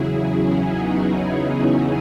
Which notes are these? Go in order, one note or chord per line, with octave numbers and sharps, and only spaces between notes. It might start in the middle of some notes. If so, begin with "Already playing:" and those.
Already playing: E2 C#3 F#3 E4 G#4
C#4 E4
B3 D#4